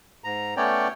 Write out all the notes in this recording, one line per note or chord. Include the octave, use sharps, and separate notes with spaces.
G#2 A#5
A3 B3 C#4 C#5 D5 G5